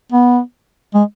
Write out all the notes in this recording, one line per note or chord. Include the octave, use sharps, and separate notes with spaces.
B3
G#3